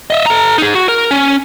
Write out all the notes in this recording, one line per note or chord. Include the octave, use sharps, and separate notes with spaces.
D#5 E5
A4 A#5
D#4 G#4
F#4
A#4
C#4